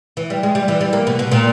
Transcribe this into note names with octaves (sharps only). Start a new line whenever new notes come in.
E3
G3
G#3
G3
E3
G3
A#3
B2
B2
A#2